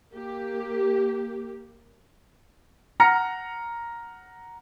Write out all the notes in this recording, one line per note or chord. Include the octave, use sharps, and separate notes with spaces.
A#3 G4
F#5 A#5 F6 A#6 C#7